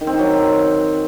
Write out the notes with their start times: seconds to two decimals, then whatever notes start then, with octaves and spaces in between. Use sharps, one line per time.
0.01 D#3
0.07 C4
0.13 D#3
0.19 F#3